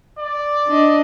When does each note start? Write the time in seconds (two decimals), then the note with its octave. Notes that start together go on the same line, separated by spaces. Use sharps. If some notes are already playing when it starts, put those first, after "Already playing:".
0.19 D5
0.68 D4 D#5